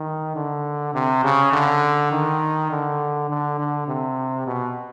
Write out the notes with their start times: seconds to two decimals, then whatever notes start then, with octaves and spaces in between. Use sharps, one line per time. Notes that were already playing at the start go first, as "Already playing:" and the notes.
Already playing: D#3
0.36 D3
0.94 C3
1.24 C#3
1.53 D3
2.12 D#3
2.71 D3
3.30 D3
3.59 D3
3.88 C3
4.47 B2